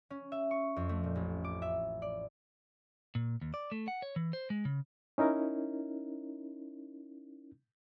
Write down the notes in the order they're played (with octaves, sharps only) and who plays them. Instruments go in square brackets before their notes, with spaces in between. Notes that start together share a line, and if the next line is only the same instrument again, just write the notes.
[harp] C#4
E5
C#6
F2
A3
A#2
A1
D6
E5
D5
[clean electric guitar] A#2
D#2
D5
A3
F#5
C#5
E3
C5
G#3
C#3
[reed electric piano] C#4 D#4 E4 A#4